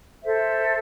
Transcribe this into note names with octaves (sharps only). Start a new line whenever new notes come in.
A4 C5 E5